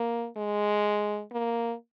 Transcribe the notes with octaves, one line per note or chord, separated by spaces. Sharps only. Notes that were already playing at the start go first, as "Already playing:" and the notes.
Already playing: A#3
G#3
A#3